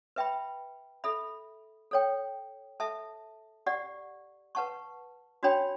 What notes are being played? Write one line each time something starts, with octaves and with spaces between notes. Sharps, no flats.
B4 E5 G5 B5
A4 E5 B5
A4 C#5 G5
A4 E5 A5
G4 D5 F#5
B4 F#5 A5 C#6
D4 F#4 C#5 G5 B5